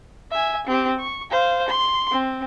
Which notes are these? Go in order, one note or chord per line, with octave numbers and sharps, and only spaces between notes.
E5 G#5
C4 G4
C#6
C5 F5
C6
C4